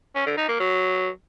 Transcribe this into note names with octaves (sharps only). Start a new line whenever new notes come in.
C#4
D3
D#4
A#3
F#3